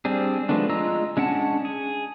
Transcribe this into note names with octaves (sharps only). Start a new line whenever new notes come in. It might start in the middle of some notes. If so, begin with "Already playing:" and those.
G3 C4 D4 G#4
F3 G#3 A3 B3 D4
G#3 F4 D#5 A#5 E6
G#3 C#4 D4 F#5 A5
G#4